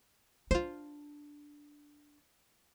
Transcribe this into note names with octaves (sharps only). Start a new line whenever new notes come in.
D4 F4 C5